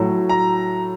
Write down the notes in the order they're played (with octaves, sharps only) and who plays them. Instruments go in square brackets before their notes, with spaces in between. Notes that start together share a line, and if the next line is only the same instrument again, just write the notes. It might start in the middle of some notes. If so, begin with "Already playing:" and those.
Already playing: [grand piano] A2 F#3
A#5